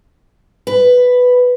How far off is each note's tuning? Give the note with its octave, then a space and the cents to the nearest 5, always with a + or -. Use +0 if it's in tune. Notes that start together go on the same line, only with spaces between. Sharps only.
B4 +5